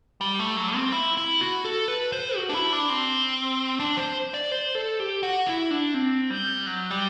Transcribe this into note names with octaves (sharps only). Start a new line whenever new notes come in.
G3
A3
F#3
C4
E4
E4
F#4
A4
B4
C5
F#4
D4
E4
D4
C4
D4
C5
D5
C5
A4
G4
F#4
E4
D4
C4
G3
F#3
G3